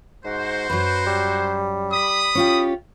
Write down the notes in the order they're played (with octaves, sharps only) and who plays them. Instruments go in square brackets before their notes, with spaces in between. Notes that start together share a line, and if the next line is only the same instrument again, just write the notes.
[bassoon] G#2 [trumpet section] F#4 C5
[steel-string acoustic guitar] F#2 F#3 [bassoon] B4
[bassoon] G3
[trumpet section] B5 D#6
[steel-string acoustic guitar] C#4 F4 G4